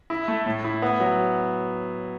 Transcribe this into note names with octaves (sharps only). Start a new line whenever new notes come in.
E4
A3
A2
E4
B3
F#3